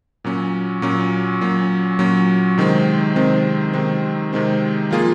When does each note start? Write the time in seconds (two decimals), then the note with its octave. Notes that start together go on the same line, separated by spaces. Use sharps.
0.24 A#2 F#3 C#4
0.82 A#2 F#3 C#4
1.41 A#2 F#3 C#4
1.99 A#2 F#3 C#4
2.58 C3 D#3 G#3 C4
3.16 C3 D#3 G#3 C4
3.74 C3 D#3 G#3 C4
4.33 C3 D#3 G#3 C4
4.91 F3 A#3 F4 G#4